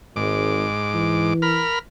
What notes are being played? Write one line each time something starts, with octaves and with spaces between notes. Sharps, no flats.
G#1 G#2 D6
E3
A#4 B5 F6